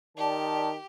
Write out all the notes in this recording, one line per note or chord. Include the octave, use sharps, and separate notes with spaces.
D#3 G4 D5 A5